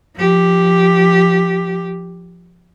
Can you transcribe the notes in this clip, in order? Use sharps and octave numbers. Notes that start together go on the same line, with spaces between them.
F3 G4